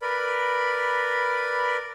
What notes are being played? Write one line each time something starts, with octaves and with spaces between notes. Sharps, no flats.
A#4 B4 D5 B5